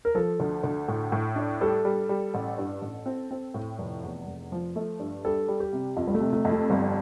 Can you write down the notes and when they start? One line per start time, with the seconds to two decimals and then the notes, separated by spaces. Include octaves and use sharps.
0.05 A#4
0.15 F3 A4
0.40 D2
0.63 D2
0.88 A2
1.12 A2
1.36 D4
1.61 G3 A4
1.85 G3
2.09 G3
2.34 A1
2.58 G2
2.81 A1
3.06 C4
3.31 C4
3.54 A2
3.78 F1
4.03 E2
4.27 F1
4.52 F3
4.76 A3
4.99 G2
5.25 G3 A4
5.48 G3
5.60 G4
5.73 C3
5.96 F2 F4
6.07 G3
6.15 A3
6.20 C3
6.33 A3
6.45 F2
6.52 A3
6.70 G1 G3